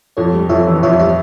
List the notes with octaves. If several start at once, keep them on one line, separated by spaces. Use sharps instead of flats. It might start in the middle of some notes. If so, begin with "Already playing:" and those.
F2 A4 C#5
G3
F2 C#5 E5
E3
F2 C#5 E5
G3 C#5 E5